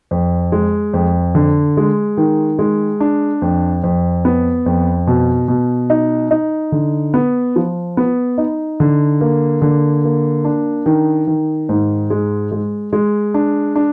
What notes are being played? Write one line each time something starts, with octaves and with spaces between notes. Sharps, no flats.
F2
G#3
F2
D3
G#3
D#3
G#3
D4
F2
F2
B3
F2
B2
B2
D#4
D#4
D3
B3
F3
B3
D#4
D3
A#3
D3
A#3
D4
D#3
D#3
G#2
G#3
G#3
G#3
D4
D4